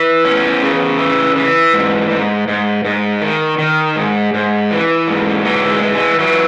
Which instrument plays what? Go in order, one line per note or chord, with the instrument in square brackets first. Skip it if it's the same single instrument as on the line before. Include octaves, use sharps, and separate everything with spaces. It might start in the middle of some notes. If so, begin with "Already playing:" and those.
Already playing: [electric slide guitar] E3
E2 C#4
C#3
E3
E3
G#2
G#2
G#2
G#2
D#3
D#3
G#2
G#2
E3
G#2
E3 F#3
G#3
E3
G#3
E3 F#3